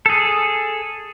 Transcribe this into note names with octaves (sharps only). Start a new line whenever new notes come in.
G#4 A4